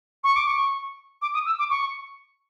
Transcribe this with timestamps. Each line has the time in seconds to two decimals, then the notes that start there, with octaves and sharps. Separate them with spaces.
0.24 C#6
0.36 D6
0.47 C#6
1.21 D6
1.34 D#6
1.46 E6
1.59 D6
1.70 C#6